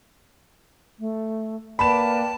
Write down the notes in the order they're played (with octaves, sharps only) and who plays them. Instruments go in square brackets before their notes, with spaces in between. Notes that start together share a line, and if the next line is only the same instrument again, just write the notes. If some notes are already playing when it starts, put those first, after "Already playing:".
[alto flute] A3
[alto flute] A#3 [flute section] B4 D5 G5 [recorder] A5 [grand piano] B5 E7